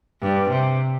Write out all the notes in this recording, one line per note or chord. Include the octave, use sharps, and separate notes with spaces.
G2
C3